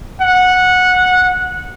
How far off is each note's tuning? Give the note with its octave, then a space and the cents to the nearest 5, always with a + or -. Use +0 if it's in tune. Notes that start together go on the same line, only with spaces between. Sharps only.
F#5 -15